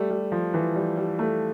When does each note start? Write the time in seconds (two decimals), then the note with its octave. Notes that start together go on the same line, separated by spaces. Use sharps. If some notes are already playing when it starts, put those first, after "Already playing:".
Already playing: G3 A3
0.10 G3
0.32 F3
0.54 E3
0.76 G3
0.97 G3
1.19 A3